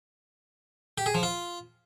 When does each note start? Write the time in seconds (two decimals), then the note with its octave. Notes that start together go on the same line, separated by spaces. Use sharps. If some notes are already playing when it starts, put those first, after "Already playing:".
0.98 G4
1.06 G#4
1.15 F3
1.23 F4